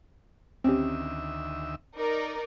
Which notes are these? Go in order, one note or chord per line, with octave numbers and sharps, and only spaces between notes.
D2 D#3 C4 C#4 G4 E5
D#4 A#4 D5